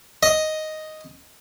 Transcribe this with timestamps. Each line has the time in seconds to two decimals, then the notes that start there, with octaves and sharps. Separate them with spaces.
0.23 D#5